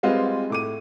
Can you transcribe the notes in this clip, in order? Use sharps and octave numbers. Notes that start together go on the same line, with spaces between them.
G3 G#3 C4 F4 B4 D#5
A2 D6 D#7